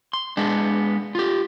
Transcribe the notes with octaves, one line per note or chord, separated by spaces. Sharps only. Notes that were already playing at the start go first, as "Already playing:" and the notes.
C6
G#3 B3 D4
F4 G4